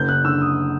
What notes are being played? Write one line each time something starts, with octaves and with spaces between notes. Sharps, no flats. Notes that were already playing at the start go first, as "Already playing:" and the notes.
Already playing: F#1 G6
F#6
D3 E6
D#6